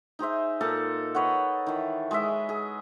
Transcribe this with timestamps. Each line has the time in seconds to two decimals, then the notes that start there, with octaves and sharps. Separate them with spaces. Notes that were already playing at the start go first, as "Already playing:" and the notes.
0.19 D#4 G#4 C5 E5
0.61 A#2 D#4 A4 A5
1.15 B4 C#5 D#5 F#5
1.66 D#3 E3
2.11 G#3 G#4 D#5 E5
2.49 G#4